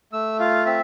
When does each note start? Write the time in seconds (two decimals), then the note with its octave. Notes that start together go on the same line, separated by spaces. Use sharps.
0.13 A3 E6
0.40 F4 F5
0.66 C4 E5